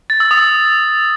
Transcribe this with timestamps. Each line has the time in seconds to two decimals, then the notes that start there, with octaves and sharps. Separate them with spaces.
0.10 A6
0.20 E6
0.31 D#6